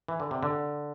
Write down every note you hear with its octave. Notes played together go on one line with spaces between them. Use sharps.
E3
D3
C3
D3